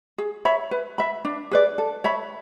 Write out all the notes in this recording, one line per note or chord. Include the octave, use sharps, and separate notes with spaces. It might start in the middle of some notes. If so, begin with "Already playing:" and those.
G#4
C#5 E5 B5
B4
E5 B5
D4
G#4 B4 D5
A4
C#5 E5 B5